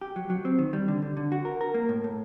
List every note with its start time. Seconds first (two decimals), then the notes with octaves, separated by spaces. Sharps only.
0.01 G4
0.16 F#3
0.30 F#3
0.45 C4
0.59 D#3
0.73 G3
0.88 D3
1.02 D3
1.17 D3
1.32 F#4
1.45 A#4
1.61 A#4
1.74 A#3
1.89 A2
2.04 A2